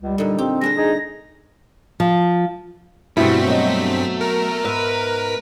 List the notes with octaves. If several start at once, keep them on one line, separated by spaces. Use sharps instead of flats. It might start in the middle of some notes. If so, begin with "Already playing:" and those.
C#2 G3
A#2 D3 D#4
C4 G4
G3 D4 G#4 C5 A#6
D#4 G#4
F3
G2 B2 G3 A3 C4 E4 F#4 B6
F#3 D#5
A#4
G#2 B4 E5 B5